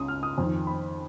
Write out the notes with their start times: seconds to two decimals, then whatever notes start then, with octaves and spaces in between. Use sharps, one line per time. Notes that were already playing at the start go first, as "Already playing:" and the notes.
Already playing: C#2 C#3 D#6
0.08 F6
0.23 D#6
0.38 F2 D#3
0.67 B5